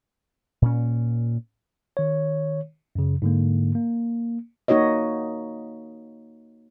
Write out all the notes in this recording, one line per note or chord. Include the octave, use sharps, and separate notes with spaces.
A#2 C#4
D#3 C#5
F#2 C#3
G#2 D3 A#3
A#3
A#3 D#4 F#4 C#5 D#5